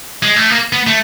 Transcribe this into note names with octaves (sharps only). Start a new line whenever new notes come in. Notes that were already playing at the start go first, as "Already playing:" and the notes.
G#3
A3
A#3
B3
A3